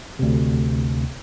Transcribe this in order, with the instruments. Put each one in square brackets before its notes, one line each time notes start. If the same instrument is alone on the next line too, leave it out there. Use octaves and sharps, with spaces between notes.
[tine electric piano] D2 C3